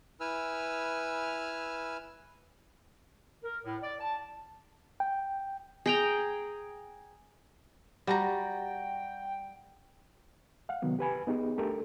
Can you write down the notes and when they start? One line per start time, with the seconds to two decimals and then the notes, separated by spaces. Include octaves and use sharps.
0.20 E4 B4 G#5 E6 F6
3.43 A#4
3.64 A2
3.83 D5
4.00 A5
5.00 G5
5.86 G#4 G5 A#5
8.07 G3 F#4 G5 A5 A#5
10.69 F5 F#5
10.82 C3 D#3 F#3 B3
10.99 G4 B4 G#5 B5
11.27 B3 D#4 G4 G#4
11.58 A3 D4 G4 A4 A#4